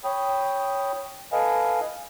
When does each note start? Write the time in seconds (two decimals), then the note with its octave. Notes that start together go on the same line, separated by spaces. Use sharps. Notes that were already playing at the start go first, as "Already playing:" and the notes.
0.04 C#5 G5 B5 D#6
1.32 A4 B4 D#5 F5 G#5